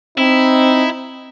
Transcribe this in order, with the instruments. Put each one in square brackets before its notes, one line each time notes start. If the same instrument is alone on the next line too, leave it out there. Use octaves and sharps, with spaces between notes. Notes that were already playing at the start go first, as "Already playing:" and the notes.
[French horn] C4 [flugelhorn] D#4 [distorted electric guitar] E4